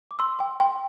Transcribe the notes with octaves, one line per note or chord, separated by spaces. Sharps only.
D6
C6 E6
G5 C6
G5 C6